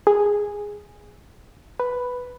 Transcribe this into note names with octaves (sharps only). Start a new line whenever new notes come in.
G#4
B4